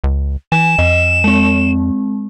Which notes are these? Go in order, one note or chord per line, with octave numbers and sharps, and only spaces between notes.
C#2
E3 G#5 E7
F2 D#5
G#3 C4